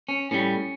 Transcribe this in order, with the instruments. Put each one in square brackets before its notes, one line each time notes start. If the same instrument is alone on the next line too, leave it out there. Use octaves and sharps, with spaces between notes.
[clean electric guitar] C#4
A2 G3 C#4